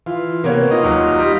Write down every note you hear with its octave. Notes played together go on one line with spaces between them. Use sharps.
E3 F4
C3 A#3 B3 C#5
D#4 F4 D#5
D#1 F#3
G3